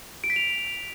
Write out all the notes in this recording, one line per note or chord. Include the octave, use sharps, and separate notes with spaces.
D7
B6
F7